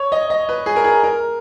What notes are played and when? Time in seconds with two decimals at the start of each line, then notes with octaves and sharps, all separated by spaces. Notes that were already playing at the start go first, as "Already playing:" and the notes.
Already playing: C#5
0.12 D#5
0.30 D#5
0.49 B4
0.66 G#4
0.76 A#4
0.84 G#4
1.03 A#4